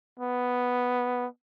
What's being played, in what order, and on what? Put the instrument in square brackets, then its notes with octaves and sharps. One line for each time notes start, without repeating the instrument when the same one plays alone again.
[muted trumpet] B3